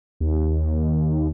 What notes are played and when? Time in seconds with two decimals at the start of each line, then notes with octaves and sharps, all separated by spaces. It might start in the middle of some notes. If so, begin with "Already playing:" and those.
0.20 D#2